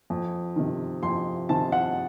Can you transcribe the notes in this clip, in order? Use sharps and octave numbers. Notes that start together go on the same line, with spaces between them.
F2
C3 D#3
F2 C6
C3 D#3 A5
F#5